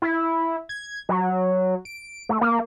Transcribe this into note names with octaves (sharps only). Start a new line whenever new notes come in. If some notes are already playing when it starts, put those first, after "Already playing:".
E4
G#6
F#3
D7
A3
A#3